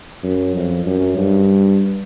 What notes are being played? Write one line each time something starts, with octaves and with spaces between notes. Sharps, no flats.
F#2
F2
F#2
G2